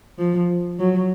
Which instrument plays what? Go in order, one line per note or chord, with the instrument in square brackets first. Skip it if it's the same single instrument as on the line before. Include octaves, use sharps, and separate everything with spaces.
[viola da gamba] F3
F#3